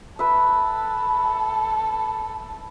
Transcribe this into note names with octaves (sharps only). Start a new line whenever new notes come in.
A4 B4 E5